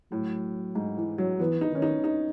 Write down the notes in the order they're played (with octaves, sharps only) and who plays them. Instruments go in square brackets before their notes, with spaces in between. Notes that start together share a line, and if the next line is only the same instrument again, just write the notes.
[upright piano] A2 [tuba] F#3
[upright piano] G#2
E3
F#3
[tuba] E3 [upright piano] B3
[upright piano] D#4
[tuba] D#3 [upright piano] C#4
[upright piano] D#4
D#4